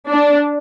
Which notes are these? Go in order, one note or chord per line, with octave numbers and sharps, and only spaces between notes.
D4